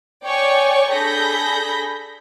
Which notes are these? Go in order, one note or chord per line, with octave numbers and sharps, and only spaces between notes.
C#5 D5 G5 G#5 C#6
D4 G#4 A4 B5 G6 A#6